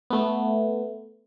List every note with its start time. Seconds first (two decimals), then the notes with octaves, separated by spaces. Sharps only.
0.10 A3 B3